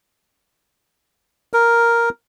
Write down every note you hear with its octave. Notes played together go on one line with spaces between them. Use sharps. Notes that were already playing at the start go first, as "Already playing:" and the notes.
A#4